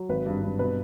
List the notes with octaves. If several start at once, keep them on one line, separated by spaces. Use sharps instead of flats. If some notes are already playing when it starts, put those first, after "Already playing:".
Already playing: F#3
G#1 B4
G2
G2
B2 B4